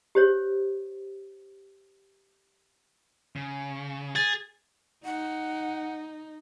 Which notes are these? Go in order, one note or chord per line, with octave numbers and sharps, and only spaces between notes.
G4 C5 C#5
C#3
G#4 A6
D#4 F#5